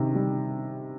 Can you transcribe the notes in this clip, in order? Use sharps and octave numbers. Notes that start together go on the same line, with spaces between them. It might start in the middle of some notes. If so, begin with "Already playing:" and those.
Already playing: C3 D#3
G3